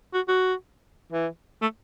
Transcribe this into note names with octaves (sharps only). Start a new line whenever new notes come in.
F#4
F#4
E3
A3